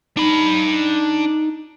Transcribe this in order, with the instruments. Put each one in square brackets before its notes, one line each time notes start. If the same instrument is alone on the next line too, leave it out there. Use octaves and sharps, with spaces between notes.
[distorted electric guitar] D4 B5 [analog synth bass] D#4